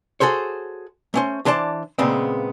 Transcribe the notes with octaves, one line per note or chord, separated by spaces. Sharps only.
F#4 G#4 A4 C5 C#5
A3 C#4 C5
E3 D4 C5 D5 A5
A#2 C#3 G#3 B3 C4